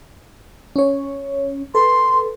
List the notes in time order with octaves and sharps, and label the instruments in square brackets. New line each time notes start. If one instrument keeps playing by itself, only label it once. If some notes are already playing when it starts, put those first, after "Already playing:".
[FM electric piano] C#4 C#5
[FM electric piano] A4 B4 [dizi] C6